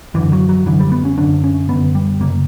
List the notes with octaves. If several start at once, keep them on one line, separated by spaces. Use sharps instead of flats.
F#2 D3 E3
F#3
F#3
F#2 D3 E3
G3
B3
C#4
F#2 D3 D4
C#4
F#2 D3 B3
G3
F#2 C#3 A#3